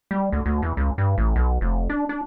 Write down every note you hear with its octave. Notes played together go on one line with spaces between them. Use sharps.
G3
D2
D2
E2
C#2
G2
A1
B1
F1
D4
D4